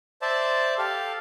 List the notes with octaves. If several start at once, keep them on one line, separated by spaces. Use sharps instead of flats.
C5 D5 E5 A5
G4 A4 F5